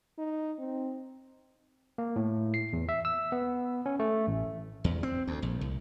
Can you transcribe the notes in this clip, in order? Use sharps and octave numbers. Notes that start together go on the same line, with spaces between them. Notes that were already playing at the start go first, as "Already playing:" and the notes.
D#4
C4
A#3
A2
C7
E2
E5
E6
B3
C#4
A3
A1
E2
C4
D2
A#1
C2